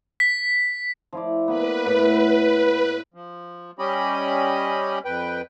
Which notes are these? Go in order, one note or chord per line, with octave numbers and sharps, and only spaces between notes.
B6
F3 E4 D5
A#3 B3 B4
A2 F#5 A5
F3
G3 C#4 G4 D#5 B5
F2 B4 G5